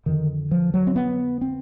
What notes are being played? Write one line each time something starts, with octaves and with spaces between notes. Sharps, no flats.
F2 D3 D#3
F3
F#3
C4
B3
C4